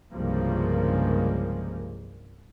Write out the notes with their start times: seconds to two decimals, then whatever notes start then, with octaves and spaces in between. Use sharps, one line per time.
0.13 C2 G2 C#3 F3 G#3 A#3